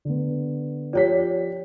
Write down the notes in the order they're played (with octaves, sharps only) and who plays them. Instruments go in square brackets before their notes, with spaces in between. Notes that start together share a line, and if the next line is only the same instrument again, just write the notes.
[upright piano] D3 B3
[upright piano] F3 G4 B6 [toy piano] C#5 D5